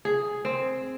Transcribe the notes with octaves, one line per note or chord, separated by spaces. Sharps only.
G#4
C4